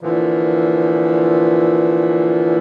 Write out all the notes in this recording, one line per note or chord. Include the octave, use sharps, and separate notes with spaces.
A#2 D3 E3 F3